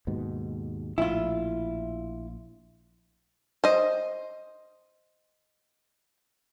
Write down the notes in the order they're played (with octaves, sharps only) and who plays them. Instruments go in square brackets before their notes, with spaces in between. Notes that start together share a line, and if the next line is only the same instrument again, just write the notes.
[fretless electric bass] D#2 G#2 B2
[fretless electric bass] A#1 A2 [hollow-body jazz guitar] E4 F4
[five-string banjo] C5 D#5